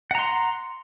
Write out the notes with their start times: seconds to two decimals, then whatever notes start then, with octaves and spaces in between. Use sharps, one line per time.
0.11 F#5
0.15 A#5
0.19 C6